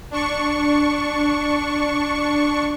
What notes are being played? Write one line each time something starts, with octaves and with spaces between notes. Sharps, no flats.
D4 C#6